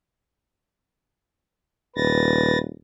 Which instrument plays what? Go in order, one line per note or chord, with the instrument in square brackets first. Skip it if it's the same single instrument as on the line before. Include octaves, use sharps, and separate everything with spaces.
[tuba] D#1 [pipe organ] B4 A6 A#6